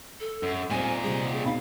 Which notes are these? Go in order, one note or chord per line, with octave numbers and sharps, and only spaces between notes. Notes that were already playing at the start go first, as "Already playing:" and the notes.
A4
F#2
A#2 G3 C4 D#4 C5 G#5
C3 G3 G#4
B2 D#4 F5 B5